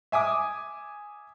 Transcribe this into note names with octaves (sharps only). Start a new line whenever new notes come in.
E5 G#5 D6 D#6